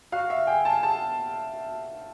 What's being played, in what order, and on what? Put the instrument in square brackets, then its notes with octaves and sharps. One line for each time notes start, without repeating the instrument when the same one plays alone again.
[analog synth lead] F#4 [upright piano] F5
[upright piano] E5
[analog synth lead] G#4 [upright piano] G5
[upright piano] A5
A5